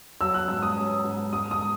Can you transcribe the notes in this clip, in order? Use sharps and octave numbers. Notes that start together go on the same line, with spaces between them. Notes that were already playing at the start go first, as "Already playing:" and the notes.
F#3 E6
F#6
G#2 E6
D#6
C#4
G#2
G#2 D#6
D#6